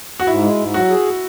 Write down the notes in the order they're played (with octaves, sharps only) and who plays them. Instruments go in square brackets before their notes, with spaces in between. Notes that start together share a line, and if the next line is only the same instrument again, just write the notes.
[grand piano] F#4
[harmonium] G#2 [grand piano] E4
[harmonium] G#3
G#2
[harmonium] F#3 [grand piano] F#4
[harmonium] G#4